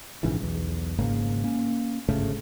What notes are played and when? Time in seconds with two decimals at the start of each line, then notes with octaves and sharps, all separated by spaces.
0.23 A#1 G#2 C#3 E3
0.42 B1 E2
0.98 G#1 G#2 C#3 A#3
1.44 A#3 C#4
2.09 G1 G#2 C#3 A3